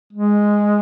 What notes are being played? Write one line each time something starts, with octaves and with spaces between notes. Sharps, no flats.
G#3